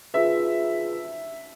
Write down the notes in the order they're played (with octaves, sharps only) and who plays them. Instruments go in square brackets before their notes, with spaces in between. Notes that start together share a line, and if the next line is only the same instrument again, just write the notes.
[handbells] F4 G#4 B4 [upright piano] E5